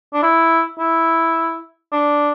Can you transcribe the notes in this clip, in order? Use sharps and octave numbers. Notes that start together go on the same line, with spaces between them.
D4
E4
E4
D4